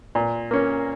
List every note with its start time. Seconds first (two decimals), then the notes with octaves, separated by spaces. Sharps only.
0.15 A#2
0.51 A#3 C#4